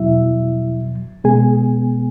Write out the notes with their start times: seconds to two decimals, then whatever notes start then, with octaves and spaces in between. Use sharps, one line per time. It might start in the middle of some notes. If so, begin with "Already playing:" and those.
Already playing: E2 B2 F#3 E4 E5
1.24 B2 G#3 B3 G#4 G#5